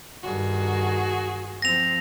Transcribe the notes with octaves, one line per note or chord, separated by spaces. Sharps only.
G2 D#3 F#4 G#4
F3 C4 A#6 F7